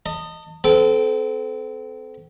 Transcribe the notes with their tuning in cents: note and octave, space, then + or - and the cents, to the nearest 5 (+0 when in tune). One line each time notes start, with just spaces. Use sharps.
D#5 -10 A5 +40
C4 -40 A4 -25 G5 +0